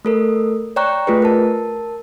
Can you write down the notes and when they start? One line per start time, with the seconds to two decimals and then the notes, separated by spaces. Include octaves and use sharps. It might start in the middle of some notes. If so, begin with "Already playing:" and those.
0.05 A3 A4 A#4
0.76 C#5 D5 G5 A#5 C#6 F#6
1.07 A3 F4 G#4 B4
1.22 A#4 A5